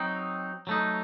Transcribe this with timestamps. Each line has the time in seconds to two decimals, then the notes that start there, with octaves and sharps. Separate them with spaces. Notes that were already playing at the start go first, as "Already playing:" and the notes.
Already playing: F#3 C4 D#4
0.67 F#3 A3 D#4